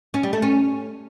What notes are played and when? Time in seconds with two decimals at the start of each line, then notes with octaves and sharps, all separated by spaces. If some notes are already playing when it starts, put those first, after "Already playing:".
0.14 C#4
0.23 G3
0.33 A3
0.42 C#4